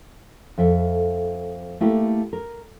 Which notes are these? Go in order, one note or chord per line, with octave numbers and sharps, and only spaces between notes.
F2 A4 E5
A3 A#3 E4 G4
A#4